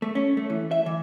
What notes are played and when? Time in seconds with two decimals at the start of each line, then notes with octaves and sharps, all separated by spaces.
0.02 A3
0.15 C#4
0.37 A3
0.50 E3
0.71 E5
0.86 E3